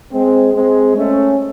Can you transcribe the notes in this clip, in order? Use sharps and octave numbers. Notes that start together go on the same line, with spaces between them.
G#3 C4
G#3 C4
A3 C#4